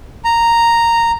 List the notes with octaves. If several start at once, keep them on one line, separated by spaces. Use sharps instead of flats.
A#5